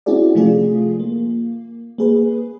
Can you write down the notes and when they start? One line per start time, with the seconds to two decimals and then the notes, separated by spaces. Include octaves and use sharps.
0.06 C4 C#4 E4 F#4 G#4 D5
0.35 C3 F3 A3 F4 G#4
1.00 A#3
1.98 A#3 G#4 B4